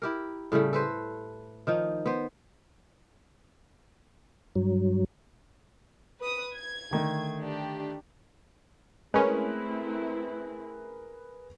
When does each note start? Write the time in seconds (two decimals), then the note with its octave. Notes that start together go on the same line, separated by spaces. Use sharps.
0.02 E4 G4 A#4
0.52 A2 C#3 G3 A3
0.73 A4 B4 C5
1.67 D#3 F3 D#4
2.06 B3 C5
4.55 G2 F#3
6.20 B4 D#6
6.55 G#6
6.91 D3 D#3 A3
7.40 D4 G4
9.14 G#3 A3 C4 C#4 E4 G#4 A#4 B4